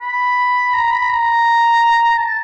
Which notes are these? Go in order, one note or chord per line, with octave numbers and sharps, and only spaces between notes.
B5
A#5
B5
A#5
A5